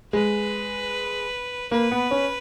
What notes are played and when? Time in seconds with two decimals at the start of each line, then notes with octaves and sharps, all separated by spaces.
0.13 G#3 B4
1.71 A#3 B4
1.91 B3
2.11 C#4